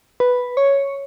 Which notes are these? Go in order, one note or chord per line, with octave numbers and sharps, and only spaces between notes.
B4
C#5